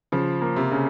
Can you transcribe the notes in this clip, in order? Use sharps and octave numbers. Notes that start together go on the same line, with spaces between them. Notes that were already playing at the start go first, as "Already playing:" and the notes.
C#3 F3
A#3
C3
C#3